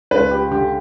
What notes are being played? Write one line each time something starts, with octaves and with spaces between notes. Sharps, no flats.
C#2 B4
G4
D3 G4